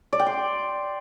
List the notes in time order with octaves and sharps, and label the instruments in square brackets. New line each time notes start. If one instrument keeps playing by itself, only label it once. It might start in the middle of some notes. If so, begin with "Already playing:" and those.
[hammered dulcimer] D5
G5
C6